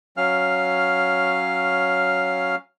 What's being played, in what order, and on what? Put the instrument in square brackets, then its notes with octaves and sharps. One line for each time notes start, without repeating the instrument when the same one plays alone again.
[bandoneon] F#3 C#4 F5 F6